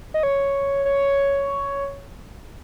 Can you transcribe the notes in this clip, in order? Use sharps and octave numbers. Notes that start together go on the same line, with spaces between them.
D#5
C#5
C#5